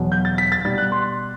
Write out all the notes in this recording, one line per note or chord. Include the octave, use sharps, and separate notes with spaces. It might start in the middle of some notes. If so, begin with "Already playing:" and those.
Already playing: E2 B2 F#3
G6
A6
B6
A6
B2 G3 A6
F#6
C6